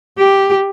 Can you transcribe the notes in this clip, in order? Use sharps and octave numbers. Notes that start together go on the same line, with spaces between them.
G4